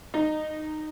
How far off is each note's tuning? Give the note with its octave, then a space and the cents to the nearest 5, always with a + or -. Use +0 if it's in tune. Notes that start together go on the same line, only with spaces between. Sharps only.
D#4 -15